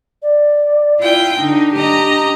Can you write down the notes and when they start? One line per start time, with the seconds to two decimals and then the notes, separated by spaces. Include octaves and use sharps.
0.22 D5
1.00 E4 F4 G5
1.38 D3 D4 D#4
1.73 G4 D#5 A#5